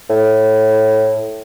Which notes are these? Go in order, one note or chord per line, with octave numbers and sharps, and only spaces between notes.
A2